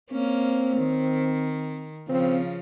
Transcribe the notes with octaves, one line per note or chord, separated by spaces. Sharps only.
A#3 C4 C#4
D#3
C#3 F3 C4